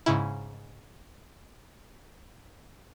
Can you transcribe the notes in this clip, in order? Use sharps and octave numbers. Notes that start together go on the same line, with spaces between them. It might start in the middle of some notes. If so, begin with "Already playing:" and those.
G#2 C#3 E4